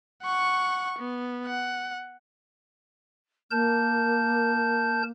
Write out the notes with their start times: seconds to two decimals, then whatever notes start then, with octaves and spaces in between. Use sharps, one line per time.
0.23 F#5 C#6
0.99 B3
1.46 F#5
3.51 A#3 A#4 A5 G6